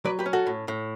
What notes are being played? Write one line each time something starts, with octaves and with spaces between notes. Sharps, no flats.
F#3 B4 D5
G4 B4
C#4
F#4 A4
A2
A2